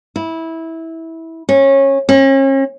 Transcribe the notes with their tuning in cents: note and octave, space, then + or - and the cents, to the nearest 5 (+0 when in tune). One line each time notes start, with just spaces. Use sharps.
E4 -15
C#4 -20
C#4 -40